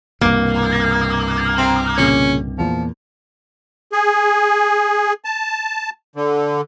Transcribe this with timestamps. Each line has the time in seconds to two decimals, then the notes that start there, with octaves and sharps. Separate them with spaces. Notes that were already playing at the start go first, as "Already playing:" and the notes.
0.21 C2 G2 B2 A#3
1.58 C4
1.98 A#2 C#3 C#4
2.58 E2 A#2 F3
3.92 G#4
5.25 A5
6.16 D3